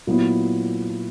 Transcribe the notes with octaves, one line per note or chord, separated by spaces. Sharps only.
A#2 F#3 B3 E4